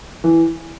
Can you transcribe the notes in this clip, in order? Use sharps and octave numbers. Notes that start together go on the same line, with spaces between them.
E3